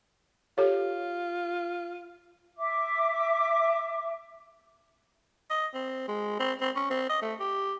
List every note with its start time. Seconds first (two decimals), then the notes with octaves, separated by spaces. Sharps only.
0.58 F4 G4 A4 C#5
2.57 E5 D6
5.50 D#5
5.74 C4
6.08 G#3
6.39 C4
6.61 C4
6.76 C#4
6.90 C4
7.09 D#5
7.22 A3
7.40 G4